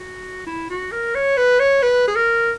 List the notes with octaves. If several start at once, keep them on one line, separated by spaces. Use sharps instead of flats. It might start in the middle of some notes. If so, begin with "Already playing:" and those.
Already playing: F#4
E4
F#4
A#4
C#5
B4
C#5
B4
G#4
A#4